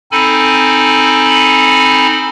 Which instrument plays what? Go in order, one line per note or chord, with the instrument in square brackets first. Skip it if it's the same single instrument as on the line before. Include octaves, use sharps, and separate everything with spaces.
[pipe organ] C4 D#4 A4 G#5 B5